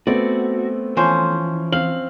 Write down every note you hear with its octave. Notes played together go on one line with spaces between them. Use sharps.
A3 B3 C4 F#4 D5
E3 F3 C#4 C5
C4 F5 F#7